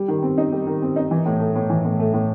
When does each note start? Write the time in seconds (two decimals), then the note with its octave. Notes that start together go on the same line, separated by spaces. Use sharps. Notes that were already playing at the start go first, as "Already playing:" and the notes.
Already playing: G3
0.08 D#3
0.23 C4
0.38 D#4
0.52 G3
0.67 D#3
0.82 C4
0.96 D#4
1.11 E3
1.25 A2
1.40 A3
1.55 A2
1.70 E3
1.85 A2
1.99 A3
2.14 A2